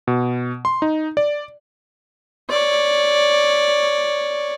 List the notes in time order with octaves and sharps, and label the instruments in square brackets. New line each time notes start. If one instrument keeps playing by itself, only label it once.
[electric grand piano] B2
C6
D#4
D5
[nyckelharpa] C#5 D5